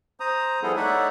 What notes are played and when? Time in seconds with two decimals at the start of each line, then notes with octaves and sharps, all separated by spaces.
0.20 C5 A#5 D#6
0.63 F3 G3 B3 E4 G#4 A4
0.76 A3 D#4 C#5 D5 E5 F#5